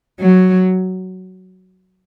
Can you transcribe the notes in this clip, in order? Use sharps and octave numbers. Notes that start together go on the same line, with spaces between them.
F#3